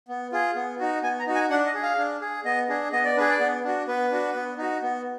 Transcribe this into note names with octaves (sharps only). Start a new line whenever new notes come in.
B3
F4 G#4
B3
D#4 F#4
B3 G#5
A#5
D#4 F#4
G#5
D4 F#5
D#5
G#4
F5
D4
G#4
B3 D#5
D4 G#4
B3 D#5
D5
D4 G#4 B4
D5
B3
D4 F#4
B3 B4
D4 F#4
B3
D#4 F#4
B3